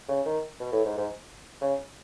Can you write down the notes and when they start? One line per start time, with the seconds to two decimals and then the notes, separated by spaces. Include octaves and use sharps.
0.09 C#3
0.25 D#3
0.60 B2
0.72 A2
0.85 G#2
0.97 G#2
1.61 C#3